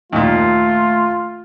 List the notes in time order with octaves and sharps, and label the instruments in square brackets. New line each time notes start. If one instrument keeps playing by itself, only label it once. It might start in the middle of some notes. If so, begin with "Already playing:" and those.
[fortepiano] D#2 A#2 [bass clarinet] A3 [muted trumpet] F4